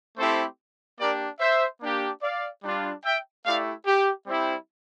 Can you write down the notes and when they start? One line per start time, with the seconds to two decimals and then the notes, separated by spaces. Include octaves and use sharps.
0.17 A3 C4 E4 G4 A4 C5
0.99 A#3 D4 G4 A#4 D5
1.40 C5 E5
1.81 A#3 D4 G4
2.22 D5 F5
2.63 G3 D4 F4
3.04 E5 G5
3.45 A3 E4 G4 D5 F5
3.86 G4
4.27 G3 C4 E4